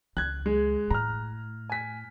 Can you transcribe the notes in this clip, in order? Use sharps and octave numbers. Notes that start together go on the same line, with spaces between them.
C#2 F#6 G#6
G#3
A2 A#5 F6
G#5 B6